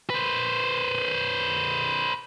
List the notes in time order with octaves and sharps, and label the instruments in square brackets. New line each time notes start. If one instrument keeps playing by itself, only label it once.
[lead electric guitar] B4 C5